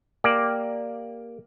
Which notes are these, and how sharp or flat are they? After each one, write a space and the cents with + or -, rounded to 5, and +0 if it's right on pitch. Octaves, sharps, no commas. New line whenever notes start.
A#3 +0 G4 +0 D5 +0